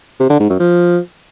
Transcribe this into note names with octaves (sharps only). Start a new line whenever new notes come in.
C3
D3
G#2
F#2
F3